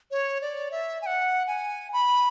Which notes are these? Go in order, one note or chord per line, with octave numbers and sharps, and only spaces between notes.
C#5
D5
E5
G#5
F#5
G#5
B5